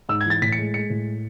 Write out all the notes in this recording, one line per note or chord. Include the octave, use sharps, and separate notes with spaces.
G#2 E6
G#6
E3 A6
A2 B6
C#7
G#3
G#3 C#7
A2